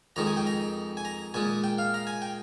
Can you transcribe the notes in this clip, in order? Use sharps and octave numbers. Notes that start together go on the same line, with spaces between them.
F2 D#3 G#3 A#5
G#5
G5
A#5
G#5
A#5
A#2 G#3 G#5
G5
F5
A#5
G#5
G5